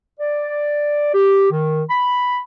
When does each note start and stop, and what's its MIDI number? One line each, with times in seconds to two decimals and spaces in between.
0.19 1.13 74
1.13 1.49 67
1.51 1.82 51
1.89 2.39 83